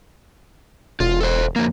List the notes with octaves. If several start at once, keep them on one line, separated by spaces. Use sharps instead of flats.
E1 F4
A4 C5
F2 A#3